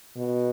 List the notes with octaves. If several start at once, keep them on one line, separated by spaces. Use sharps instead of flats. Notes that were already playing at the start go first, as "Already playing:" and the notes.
B2